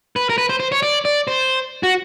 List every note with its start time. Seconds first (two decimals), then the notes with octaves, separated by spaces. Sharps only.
0.16 B4
0.29 A#4
0.38 B4
0.49 C5
0.60 C5
0.72 C#5
0.82 D5
1.05 D5
1.28 C5
1.83 F#4